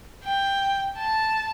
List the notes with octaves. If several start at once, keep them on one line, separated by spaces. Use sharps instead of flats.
G5
A5